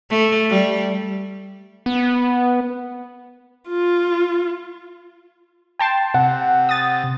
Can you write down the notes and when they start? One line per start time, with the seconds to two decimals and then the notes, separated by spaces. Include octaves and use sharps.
0.10 A3
0.50 G3
1.86 B3
3.68 F4
5.79 G5 A5 C6
6.14 C3 F#5
6.69 D#6 A6